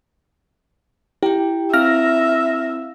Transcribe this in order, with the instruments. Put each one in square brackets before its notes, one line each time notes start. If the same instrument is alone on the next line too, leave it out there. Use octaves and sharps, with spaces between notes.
[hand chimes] E4 G5 [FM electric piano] G4
[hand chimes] C4 E4 F5 [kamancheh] E5 [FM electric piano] F6 A#6